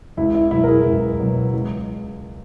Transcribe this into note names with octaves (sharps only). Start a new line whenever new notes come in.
C#2 E4
E4
B2 F#3 E4
A#4
G#4
C#2
B2 F#3
C#2